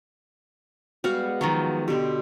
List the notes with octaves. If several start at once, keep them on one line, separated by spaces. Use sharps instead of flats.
G3 G#3 B3 F#4 F5 F#5
D#3 F3 F#3
B2 D3 G4 C6